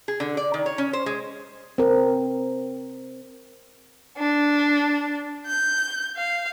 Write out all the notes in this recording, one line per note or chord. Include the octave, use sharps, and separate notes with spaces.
G#4
D3
D5
D#3
C#5
C#4
C5
G#3
C4 A#4
D4
G6
F5